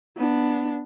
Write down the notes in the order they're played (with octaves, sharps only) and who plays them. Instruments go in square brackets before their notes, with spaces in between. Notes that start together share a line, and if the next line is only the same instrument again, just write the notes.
[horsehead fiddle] B3 D4